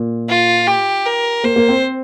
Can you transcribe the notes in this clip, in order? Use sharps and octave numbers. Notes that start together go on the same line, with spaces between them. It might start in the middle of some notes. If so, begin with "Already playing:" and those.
Already playing: A#2
F4
G4
A#4
A#3 C5
A#3
C4